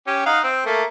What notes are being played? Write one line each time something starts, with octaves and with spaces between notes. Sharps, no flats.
C#4 G4
D#4 F5 F#5
C4
A3 A#3 A#4